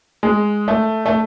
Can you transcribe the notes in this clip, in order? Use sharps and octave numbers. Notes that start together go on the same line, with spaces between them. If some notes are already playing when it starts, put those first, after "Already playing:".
G#3
A3
A3